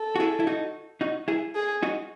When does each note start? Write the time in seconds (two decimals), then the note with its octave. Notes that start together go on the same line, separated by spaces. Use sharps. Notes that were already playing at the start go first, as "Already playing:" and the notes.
Already playing: A4
0.16 F#4
0.20 E4 G#4
0.40 E4
0.47 D#4 F#4
1.01 D#4 F#4
1.28 E4 G#4
1.55 G#4
1.83 D#4 F#4